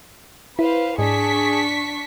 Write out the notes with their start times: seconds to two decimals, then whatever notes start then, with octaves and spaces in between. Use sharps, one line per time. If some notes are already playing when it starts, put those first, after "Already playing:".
0.59 E4 B4 C5 F5
0.99 G#2 D4 G#4 C#6 B6